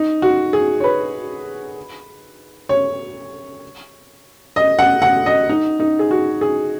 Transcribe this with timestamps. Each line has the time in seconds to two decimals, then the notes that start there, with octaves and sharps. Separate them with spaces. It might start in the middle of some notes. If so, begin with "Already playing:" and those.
Already playing: D#4
0.22 F#4
0.53 G#4
0.80 C#5
0.84 B4
2.69 C#5
4.56 D#5
4.79 F#5
5.02 F#5
5.26 D#5
5.49 D#4
5.80 D#4
5.99 G#4
6.11 F#4
6.41 G#4